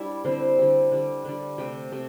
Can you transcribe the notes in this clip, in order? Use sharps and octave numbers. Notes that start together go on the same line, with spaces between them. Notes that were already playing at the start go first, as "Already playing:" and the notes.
Already playing: G3 D4 E4 D5 E5
D3 G3 C4 C5
D3 G3
D3 G3
D3 G3
C3 A3 G4 G5
C3 A3